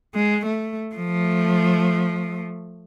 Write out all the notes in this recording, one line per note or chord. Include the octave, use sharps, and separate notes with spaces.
G#3
A3
F3 A3